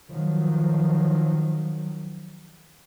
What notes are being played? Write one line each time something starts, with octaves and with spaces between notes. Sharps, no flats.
D#3 F3 F#3